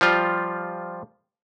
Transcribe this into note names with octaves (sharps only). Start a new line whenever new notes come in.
F3 G3 F4